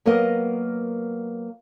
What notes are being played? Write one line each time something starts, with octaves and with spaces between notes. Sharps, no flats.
F#3 A#3 B3 A#4 D#5